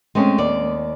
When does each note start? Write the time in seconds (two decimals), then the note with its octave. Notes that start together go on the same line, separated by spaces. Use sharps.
0.15 G#3 A3 C4 C#4
0.38 D#2 D5